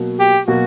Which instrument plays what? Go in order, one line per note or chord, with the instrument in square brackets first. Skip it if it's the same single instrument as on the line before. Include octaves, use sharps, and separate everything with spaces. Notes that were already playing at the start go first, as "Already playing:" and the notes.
Already playing: [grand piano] B2 F#3 A#3
[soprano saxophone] G4
[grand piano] B2 F#3 A#3 [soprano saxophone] F#4